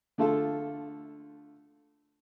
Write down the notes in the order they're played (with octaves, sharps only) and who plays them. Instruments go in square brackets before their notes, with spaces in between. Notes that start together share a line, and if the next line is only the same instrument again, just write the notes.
[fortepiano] D3 A3 F4 A4